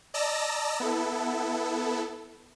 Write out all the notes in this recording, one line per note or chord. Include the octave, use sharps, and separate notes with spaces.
D5 D#5 A5 A#5 E6 A#6
B3 E4 A4